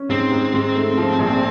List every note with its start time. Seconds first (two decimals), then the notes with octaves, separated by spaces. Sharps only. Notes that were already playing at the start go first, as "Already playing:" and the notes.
Already playing: C#4
0.10 G#2 C4
0.31 G#2
0.54 G#2
0.75 A3
0.98 F3
1.19 A#1